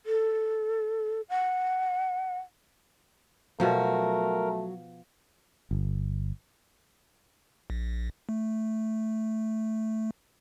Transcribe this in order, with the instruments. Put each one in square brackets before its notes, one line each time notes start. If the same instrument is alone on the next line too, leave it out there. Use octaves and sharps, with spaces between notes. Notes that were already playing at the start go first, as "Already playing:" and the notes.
[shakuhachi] A4
F#5
[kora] B2 F3 [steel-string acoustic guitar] F#3 F#4 [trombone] A3 [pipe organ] A#4
[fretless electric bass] G1
[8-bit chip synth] A#1
A3